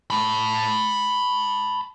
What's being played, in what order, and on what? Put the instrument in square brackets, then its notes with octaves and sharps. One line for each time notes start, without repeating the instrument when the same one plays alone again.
[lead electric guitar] A5 B5